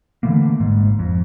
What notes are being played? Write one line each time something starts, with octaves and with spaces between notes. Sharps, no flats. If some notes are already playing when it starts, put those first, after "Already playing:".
D3 E3 A3 A#3
G#1 G#2
F2